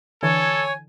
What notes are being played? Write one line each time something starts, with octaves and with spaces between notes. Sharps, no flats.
D3 E3 A4 C#5 G#5